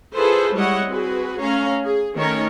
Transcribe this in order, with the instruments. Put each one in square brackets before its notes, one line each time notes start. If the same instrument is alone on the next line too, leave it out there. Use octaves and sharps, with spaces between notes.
[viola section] E4 F4 G#4 A4 B4 C5
G3 G#3 E4 C#5 D#5 F#5
C4 F#4 G#4 B4
A3 C#4 C#5 F5 A#5
G#4
D#3 A3 C#4 A#4 C#5